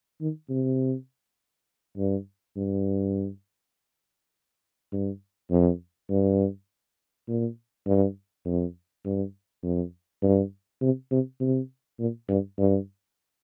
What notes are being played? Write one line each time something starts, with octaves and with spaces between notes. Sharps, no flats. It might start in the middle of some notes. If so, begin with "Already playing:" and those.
D#3
C3
G2
G2
G2
F2
G2
A#2
G2
F2
G2
F2
G2
C3
C3
C3
A#2
G2
G2